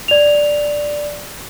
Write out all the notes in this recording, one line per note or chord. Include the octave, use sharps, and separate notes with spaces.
D5 F7